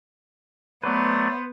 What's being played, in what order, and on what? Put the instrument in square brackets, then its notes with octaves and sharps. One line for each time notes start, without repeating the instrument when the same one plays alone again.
[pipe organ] F#3 A3 D5 [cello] B3 [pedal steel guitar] B4 C5